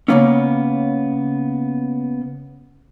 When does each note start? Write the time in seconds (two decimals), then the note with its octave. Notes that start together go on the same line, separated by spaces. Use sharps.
0.08 C#3 G#3 A#3 B3 C#4